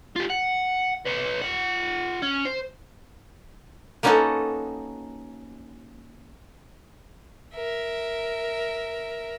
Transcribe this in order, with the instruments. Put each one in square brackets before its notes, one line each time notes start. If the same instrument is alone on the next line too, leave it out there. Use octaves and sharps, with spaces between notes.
[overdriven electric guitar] F4 G4
F#5
B4 C#5
F4 F#5
C#4
C5
[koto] A#3 B3 C#4 D#4 F#4 A4
[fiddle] A#4 E5